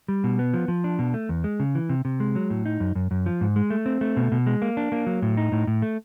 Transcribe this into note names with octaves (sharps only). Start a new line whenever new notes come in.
G3
B2
B3
F3
F3
D4
B2
A3
E2
G#3
C#3
E3
C3
C3
G#3
F#3
A2
D#4
F#2
F#2
F#2
F3
G#2
G#3
A3
C4
A3
B2
B2
G#3
A#3
D4
A#3
F#3
A2
D#4
A2
A2
A3